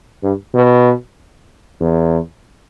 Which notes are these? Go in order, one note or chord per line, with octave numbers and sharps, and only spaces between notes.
G2
B2
E2